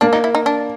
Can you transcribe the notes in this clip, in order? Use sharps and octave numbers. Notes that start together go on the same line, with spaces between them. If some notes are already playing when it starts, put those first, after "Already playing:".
A#3 D4
D#4
E4
D#4
D4